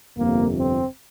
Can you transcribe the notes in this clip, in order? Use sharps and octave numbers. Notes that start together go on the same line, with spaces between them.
G1 F2 C3 A#3
C4